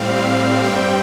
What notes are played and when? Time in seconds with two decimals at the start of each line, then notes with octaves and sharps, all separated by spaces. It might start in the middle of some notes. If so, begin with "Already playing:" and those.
Already playing: A2 G3 C4 F5
0.16 F5
0.64 G2 G3 C4 G5